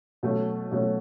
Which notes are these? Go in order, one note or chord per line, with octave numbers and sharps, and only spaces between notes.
B2 F#3 A3 C#4
B2 F#3 A3 C#4